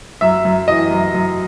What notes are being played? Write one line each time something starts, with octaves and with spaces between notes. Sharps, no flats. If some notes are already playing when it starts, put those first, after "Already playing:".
F#2 E5
F#2
E3 D#5
F#2
F#2